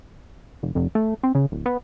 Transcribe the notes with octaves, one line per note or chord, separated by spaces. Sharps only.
F1
F1
A3
C4
C#3
D1
B3